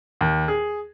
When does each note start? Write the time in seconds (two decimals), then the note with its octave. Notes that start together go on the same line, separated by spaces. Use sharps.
0.21 D#2
0.48 G#4